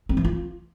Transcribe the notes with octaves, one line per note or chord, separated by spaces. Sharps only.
C4
E3
F4